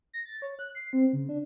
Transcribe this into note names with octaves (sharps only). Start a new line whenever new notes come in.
A#6
A6
C#5
F#6
C7
C4
C#3
D4